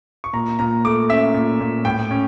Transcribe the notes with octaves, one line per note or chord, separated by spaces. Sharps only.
C#6
A#2 A#5
A#2 A#5
A3 D6
C#4 E5
A#2
A#2
A2 G5
C#4